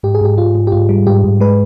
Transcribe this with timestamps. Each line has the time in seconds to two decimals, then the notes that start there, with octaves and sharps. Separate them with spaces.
0.03 G#2 G4
0.15 G#4
0.21 G#2 G4
0.38 G#2 F4
0.55 G#2
0.67 G4
0.72 G#2 F4
0.89 G3
1.07 G#2 G4
1.24 G#2
1.40 G#3 B4